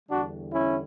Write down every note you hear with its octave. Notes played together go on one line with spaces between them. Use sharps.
E2 D3 G3 D4 F#4
C#4 E4